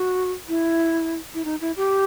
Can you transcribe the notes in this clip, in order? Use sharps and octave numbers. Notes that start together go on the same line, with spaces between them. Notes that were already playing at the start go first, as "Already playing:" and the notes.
Already playing: F#4
E4
E4
D#4
E4
G4